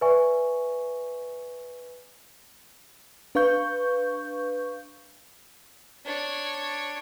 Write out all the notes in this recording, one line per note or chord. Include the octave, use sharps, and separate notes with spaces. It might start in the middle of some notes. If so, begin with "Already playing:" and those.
B4 D5 E5 G#5 C#6
D4 B4 F5 C#6 G6
D4 C#5